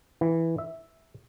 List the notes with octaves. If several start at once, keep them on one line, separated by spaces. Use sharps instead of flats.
E3
E5